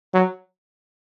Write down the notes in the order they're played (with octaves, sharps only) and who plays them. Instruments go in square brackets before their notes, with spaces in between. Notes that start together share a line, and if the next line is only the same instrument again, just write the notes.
[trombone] F#3